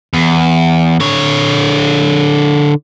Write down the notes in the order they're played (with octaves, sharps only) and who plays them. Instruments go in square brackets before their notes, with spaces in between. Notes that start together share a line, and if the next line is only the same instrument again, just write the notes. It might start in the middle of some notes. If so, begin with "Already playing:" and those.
[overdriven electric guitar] E2
D3 C#5